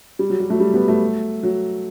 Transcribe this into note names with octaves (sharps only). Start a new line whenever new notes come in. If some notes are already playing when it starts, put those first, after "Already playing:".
G3
F#3
G3
F#3 A3
G3
G3 B3
F#3 A3
F#3